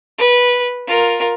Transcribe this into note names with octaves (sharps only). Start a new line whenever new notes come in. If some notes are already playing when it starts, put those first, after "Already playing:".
B4
F4 A#4